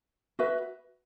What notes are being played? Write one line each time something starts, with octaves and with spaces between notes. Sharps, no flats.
F#4 B4 E5